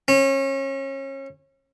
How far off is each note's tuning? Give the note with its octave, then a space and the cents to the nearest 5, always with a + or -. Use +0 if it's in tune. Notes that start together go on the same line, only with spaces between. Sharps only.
C#4 -30